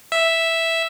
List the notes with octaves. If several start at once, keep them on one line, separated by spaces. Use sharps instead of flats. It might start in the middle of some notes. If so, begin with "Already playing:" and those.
E5